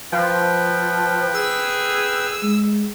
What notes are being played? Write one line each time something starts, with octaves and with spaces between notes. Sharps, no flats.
F3 B4 G5
G#4 E6
G#3